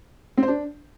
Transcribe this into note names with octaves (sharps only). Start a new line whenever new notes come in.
C4
C5
D4